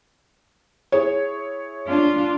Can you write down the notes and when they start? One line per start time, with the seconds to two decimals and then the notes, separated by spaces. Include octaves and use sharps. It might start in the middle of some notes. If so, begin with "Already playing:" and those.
0.92 E4 G#4 C#5
1.87 D4 F4